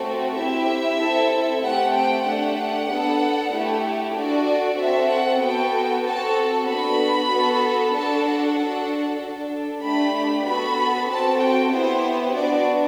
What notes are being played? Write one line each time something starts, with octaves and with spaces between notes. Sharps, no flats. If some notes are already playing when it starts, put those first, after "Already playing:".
Already playing: A3 C4 F#4 A4
C4 E4 G4 E5
C4 E4 A4
A3 C4 G4 F#5
G5
A3 D4 G4 F#5
B3 D4 A4
A3 E4 G4
D4 F#4 A4 D5
C4 F#4 A4 E5
F#5
B3 F#4 A4 G5
C4 F#4 A4 A5
B3 D4 F#4 A4 B5
B3 F#4 A4
D4 F#4 A4 A5
F#5
D4 F#4 A4
D4 A4
A3 D4 G4 B5
B3 F#4 A4 B5
C4 F#4 A4 A5
G5
B3 E4 G4 C5
B3 D4 F#4 D5